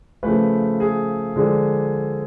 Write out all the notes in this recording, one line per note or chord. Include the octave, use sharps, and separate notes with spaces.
C#3 F3 A3 B4
G#4
D3 F3 G#3